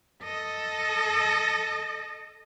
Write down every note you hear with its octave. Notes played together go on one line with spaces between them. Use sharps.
A4 D#5